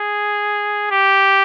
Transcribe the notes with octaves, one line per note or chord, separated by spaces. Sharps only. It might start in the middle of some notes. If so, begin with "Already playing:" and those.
Already playing: G#4
G4